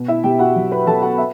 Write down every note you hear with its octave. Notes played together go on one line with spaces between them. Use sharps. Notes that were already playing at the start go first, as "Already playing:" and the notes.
Already playing: B2
E4 E5
B2 G4 G5
F#4 F#5
F#3
B4 B5
F#3 A4 A5
F#4 F#5
E5